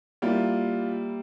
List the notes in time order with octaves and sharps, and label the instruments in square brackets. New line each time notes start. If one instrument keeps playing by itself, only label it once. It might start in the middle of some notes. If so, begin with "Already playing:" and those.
[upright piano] G3 A#3 E4 G4 [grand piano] F4